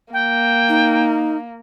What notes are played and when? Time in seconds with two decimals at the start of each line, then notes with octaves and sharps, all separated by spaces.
0.13 A#3 G5
0.69 D#4